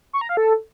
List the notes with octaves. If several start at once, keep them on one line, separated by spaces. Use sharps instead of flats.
C#6
A#5
F5
A4